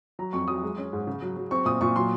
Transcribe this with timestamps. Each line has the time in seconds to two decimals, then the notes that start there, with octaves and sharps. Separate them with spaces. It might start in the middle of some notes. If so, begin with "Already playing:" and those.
0.19 F#3 A#5
0.33 F2 C#6
0.48 F#3 D#6
0.63 G#3
0.78 C#4
0.93 G#2
1.07 C#3
1.22 F#3
1.37 F#3
1.51 C4 C#6
1.66 A#2 D#6
1.81 A#2 C#6
1.96 F#3 C6